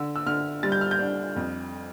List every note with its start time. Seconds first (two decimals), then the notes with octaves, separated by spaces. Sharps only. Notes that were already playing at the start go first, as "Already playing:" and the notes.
Already playing: D3 E6
0.16 E6
0.26 D3 F6
0.63 G3 A6
0.72 G6
0.81 F6
0.91 G6
0.99 D4
1.36 F2